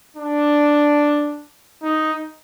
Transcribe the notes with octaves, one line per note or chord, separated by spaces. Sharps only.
D4
D#4